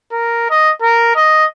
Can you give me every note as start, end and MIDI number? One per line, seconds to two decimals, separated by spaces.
0.12 0.46 70
0.50 0.71 75
0.82 1.14 70
1.15 1.45 75